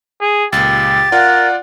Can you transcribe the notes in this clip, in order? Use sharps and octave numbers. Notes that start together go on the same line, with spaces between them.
G#4
C#2 A#2 G4 A6
F4 A#4 D5 F#5